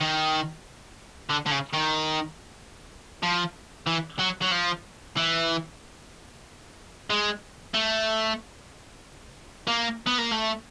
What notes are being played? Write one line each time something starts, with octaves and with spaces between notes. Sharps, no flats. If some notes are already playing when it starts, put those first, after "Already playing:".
D#3
D3
D3
C#3
D#3
F3
E3
F#3
F#3
F3
E3
G#3
A3
A#3
B3
A#3
A3